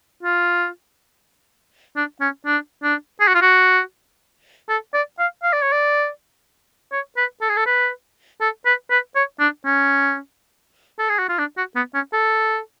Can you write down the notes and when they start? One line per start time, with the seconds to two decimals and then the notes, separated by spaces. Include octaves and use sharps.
0.23 F4
1.96 D4
2.21 C#4
2.46 D4
2.83 D4
3.20 G#4
3.28 F#4
3.35 F4
3.42 F#4
4.69 A4
4.94 D5
5.19 F5
5.43 F5
5.53 D5
5.62 C#5
5.72 D5
6.92 C#5
7.17 B4
7.42 A4
7.49 G#4
7.57 A4
7.66 B4
8.41 A4
8.66 B4
8.91 B4
9.15 C#5
9.40 D4
9.65 C#4
10.99 A4
11.09 G#4
11.19 F#4
11.29 F4
11.39 D4
11.57 F#4
11.76 B3
11.94 C#4
12.13 A4